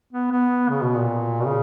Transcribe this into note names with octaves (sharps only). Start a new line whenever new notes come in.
B3
B3
C#3
B2
A#2
B2
C#3